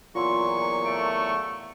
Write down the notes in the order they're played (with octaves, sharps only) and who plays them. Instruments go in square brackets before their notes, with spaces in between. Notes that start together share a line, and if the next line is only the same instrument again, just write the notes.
[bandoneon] E2 F#3 C#6 [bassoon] A#2 [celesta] F4 C6 E6
[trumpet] A3 [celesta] D7